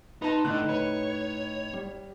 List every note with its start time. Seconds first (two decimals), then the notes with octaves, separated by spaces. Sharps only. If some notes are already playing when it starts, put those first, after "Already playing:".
0.22 D#4 B4 A5 C6
0.45 A2 D3 D#4 F#6
0.69 B4 C#5
1.73 G3